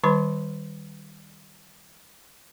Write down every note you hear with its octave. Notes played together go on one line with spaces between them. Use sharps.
D#3 G3 B4 A5 B5 C6